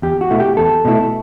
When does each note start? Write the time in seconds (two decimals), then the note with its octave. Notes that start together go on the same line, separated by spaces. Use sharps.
0.02 E2 G4
0.21 F#4
0.30 B2 A3 E4
0.40 G4
0.57 E2 A4
0.85 B2 A3 E4